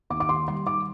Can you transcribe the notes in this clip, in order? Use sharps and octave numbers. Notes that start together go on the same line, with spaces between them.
D#2 D6
D6
D#3 C6
G3 C6
D#3 D6